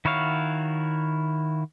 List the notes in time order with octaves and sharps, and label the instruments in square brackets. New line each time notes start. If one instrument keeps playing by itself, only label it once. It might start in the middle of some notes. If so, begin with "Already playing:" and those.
[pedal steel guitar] D#3 E4 F#4 C#5 F5